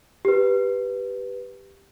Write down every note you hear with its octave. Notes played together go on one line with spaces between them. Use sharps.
G4 B4